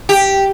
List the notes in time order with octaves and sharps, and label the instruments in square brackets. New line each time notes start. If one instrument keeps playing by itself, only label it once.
[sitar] G4